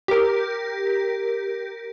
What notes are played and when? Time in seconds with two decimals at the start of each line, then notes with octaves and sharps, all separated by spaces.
0.08 G4 A#4